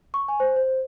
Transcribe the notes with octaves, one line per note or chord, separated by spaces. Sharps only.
C#6
G#5
C5
C5